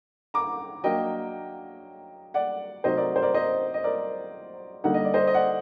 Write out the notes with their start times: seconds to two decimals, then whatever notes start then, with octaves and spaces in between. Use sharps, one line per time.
0.34 A#5 D6
0.84 F#3 A#3 D4 D#5 G5
2.34 D5 F#5
2.84 C3 F#3 A3 D#4 C5 D#5
2.97 A#4 D5
3.16 C5
3.22 A#4 D5
3.34 C5 D#5
3.74 D#5
3.84 A#4 D5
4.84 D3 G3 A#3 D#4 F#5
4.94 D#5
5.04 D5
5.14 C5 D#5
5.27 D#5
5.34 D5 F#5